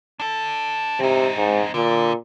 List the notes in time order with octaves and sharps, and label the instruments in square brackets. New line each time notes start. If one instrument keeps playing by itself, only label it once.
[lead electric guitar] D4 A4
[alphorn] C3 [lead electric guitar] C4 D#4
[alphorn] G#2
[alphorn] A#2 [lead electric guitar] D3